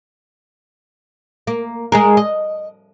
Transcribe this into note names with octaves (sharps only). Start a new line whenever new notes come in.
A#3
G#3 G#4 A#4
D#5